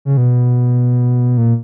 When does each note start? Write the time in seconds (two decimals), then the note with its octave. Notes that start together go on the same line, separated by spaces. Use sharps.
0.05 C#3
0.17 B2
1.37 A#2